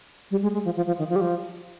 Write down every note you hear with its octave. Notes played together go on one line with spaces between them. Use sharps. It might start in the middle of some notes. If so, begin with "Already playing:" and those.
G3
G#3
G#3
F3
F3
F3
D#3
F3
G3
F3